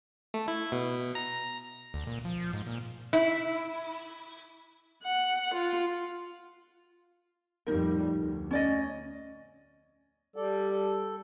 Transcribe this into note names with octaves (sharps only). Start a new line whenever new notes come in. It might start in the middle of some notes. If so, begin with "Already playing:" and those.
A3
E4
B2
A#5
D2
A#2
F3
G#2
A#2
E4
F#5
F4
F2 A2 G3 D#4 A#4
D2
C#4 D5 D#5
G3 A4 D5
A4